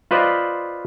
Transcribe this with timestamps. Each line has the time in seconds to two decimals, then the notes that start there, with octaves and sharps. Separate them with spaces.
0.11 F4 B4 C5 D5 D#5